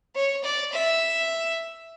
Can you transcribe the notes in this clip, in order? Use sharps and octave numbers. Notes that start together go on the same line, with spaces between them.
C#5
D5
E5